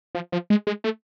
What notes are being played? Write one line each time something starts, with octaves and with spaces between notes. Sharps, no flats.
F3
F3
G#3
G#3
A3